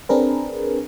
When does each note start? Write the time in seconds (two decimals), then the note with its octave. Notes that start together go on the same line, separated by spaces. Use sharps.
0.09 C4 D4 G#4 A#4 B4